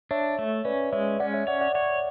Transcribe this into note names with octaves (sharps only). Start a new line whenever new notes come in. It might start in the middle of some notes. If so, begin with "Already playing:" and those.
D4 C#5 E5
A3
C#4 B4 D5
G#3 C#5 E5
C#4 D5 F#5
C#5 E5
C#5 D5 F#5
D5 F#5
C#5 D5 F#5